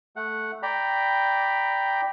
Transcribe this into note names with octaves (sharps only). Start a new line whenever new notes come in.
A3 F#5
D5 G5 A#5 B5